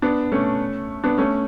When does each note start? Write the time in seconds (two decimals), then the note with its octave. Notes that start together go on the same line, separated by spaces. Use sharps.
0.02 B3 D4
0.32 A3 C#4
1.04 B3 D4
1.18 A3 C#4